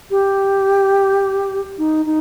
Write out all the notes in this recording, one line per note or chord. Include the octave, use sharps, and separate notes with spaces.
G4
D#4
D#4